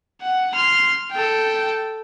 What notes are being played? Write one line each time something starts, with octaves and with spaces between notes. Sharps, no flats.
F#5
C6 F6
A4 G5